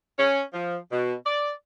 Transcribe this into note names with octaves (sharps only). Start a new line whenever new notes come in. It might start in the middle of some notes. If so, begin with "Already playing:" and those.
C#4
F3
B2
D5